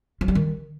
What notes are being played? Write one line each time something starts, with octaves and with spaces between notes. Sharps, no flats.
F3
G3
D#3